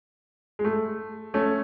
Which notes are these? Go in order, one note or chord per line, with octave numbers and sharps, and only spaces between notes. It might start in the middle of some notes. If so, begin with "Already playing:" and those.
G#3
A3
A3 C#4